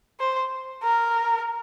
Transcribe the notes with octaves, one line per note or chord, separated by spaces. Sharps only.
C5
A#4